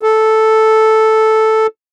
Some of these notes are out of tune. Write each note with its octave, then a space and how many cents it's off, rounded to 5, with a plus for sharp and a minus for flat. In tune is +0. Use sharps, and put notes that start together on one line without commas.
A4 -5